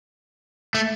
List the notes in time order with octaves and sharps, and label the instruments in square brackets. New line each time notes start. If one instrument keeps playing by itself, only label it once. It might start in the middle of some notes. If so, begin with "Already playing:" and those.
[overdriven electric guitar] A3